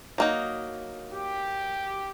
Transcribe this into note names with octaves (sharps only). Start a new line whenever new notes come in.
F#3 A#3 D#4
G4